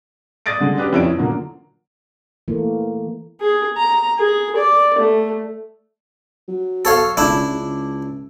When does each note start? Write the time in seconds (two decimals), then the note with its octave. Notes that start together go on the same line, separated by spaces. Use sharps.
0.46 D5 D#6 A6 A#6 D7
0.60 D3 G#3
0.77 C#4 D4 G4 B4 D5
0.93 F2 E4 C#5 D7
1.06 E3
1.18 A#2 D3 F#3 A#3
2.48 E3 A3 A#3
3.41 G#4
3.77 A#5
4.19 G#4
4.56 D5
4.98 A3
6.48 F#3
6.85 A4 C#5 F5
7.17 C#2 D4 E4
7.50 C#2